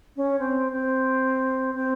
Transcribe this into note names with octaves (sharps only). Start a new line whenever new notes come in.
C#4
C4
C4
C4